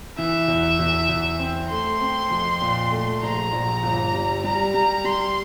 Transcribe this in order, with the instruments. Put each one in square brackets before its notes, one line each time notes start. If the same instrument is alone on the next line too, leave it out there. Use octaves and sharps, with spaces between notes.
[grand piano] E3 [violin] E5
[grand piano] E2
E2
E2
C4
[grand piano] A3 [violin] C6
[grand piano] C4
F2
A#2
A3
[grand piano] A#1 [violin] A#5
[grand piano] A#1
G1
G3
[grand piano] G3 [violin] A#5
[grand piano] G3 [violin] A#5
[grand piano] G3 [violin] C6